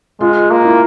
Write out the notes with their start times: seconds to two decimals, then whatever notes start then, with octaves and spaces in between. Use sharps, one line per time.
0.20 G#3 F4
0.51 A#3
0.64 E4